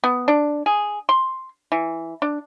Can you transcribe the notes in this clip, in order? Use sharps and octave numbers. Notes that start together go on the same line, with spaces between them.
B3
D4
G#4
C6
E3
D4